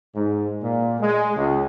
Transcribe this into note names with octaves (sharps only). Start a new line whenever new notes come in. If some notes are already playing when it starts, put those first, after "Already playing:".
G#2
A#2
G#3
C#2